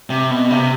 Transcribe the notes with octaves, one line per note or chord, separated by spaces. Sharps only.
C3
B2
C3